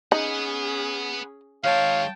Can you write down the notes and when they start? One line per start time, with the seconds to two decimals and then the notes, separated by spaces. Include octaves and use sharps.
0.12 C#4 D#4 G#4 B4 F#5
1.64 D#3 G#3 C#5 F5 G5 A5